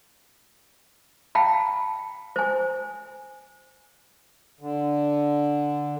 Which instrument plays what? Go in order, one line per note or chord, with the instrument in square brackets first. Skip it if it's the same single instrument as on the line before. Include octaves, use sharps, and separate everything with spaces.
[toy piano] F5 G5 A5 B5
C5 G#5
[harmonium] D3